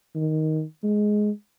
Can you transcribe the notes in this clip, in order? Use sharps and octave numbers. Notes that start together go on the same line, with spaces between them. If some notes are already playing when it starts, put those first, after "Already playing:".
D#3
G#3